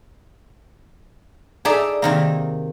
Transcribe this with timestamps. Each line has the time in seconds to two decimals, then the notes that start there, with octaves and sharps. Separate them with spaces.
1.65 D#4 G#4 A4 D5 E5
2.02 C3 D#3 A#3